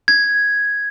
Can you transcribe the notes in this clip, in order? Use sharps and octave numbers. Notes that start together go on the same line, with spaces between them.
G#6